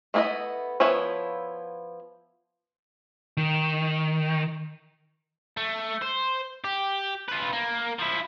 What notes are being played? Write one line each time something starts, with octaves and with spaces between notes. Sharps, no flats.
A3 B3 E4 A#4 D#5
F3 B3 E4 C#5 E5
D#3
A3
C5
G4
F4 B4
A#3
F3 E4